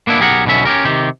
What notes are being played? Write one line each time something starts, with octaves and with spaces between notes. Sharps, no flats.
A#3 B3 D4 E4
B1 G4 G#4 A#4 D#5 F#5
B1 B2 D3 C#4 E5
C#4 D#4 G4 A#4
C3 D#3 G4